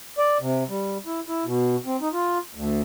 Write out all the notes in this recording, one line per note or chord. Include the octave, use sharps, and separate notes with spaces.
D5
C3
G3
E4
E4
B2
C4
D#4
F4
D2